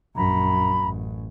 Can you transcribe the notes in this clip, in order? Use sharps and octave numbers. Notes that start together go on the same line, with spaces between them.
A#1 F#2 A#5 B5
A1